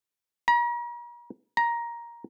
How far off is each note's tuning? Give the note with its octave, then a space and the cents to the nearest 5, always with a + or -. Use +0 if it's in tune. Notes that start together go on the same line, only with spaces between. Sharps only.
A#5 +40
A#5 +10